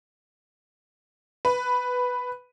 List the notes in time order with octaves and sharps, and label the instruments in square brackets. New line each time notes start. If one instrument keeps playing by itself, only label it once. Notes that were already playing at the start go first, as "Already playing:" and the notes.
[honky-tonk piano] B4